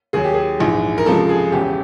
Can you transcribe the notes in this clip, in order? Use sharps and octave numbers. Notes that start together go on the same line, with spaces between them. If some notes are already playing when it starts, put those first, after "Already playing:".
D#2 D#3 F#3 G#4
G4
G#4
A#1 G#2 E3
A#4
C#2 C3 F3 G#3 A4
G#4
E1 E2 C#3 G4